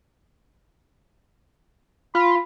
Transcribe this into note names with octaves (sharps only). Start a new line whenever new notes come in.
F4 B5